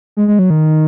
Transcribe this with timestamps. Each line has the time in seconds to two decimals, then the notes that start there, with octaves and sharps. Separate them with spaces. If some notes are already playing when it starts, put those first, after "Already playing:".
0.17 G#3
0.28 G#3
0.39 F#3
0.50 D#3